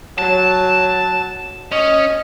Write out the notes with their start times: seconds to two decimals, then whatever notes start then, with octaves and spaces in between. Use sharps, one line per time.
0.18 F#3 A5
1.72 C#4 D#5